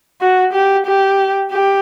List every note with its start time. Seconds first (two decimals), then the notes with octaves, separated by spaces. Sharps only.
0.21 F#4
0.53 G4
0.86 G4
1.52 G4